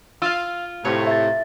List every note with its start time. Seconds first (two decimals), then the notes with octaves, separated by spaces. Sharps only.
0.22 F4 F5 E6
0.85 A2 C3 C#5
1.07 E5 A6